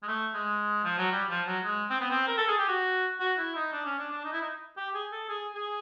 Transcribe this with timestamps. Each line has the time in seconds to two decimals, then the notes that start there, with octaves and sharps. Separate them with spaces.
0.03 G#3
0.08 A3
0.34 G#3
0.84 F3
0.98 F#3
1.12 G3
1.30 F3
1.47 F#3
1.64 G#3
1.90 C4
2.00 B3
2.10 C4
2.27 A#4
2.37 A4
2.48 G#4
2.58 G4
2.68 F#4
3.20 F#4
3.38 E4
3.56 D#4
3.72 D4
3.86 C#4
3.99 D4
4.11 D4
4.24 D#4
4.33 E4
4.41 D#4
4.77 G4
4.94 G#4
5.12 A4
5.29 G#4
5.56 G#4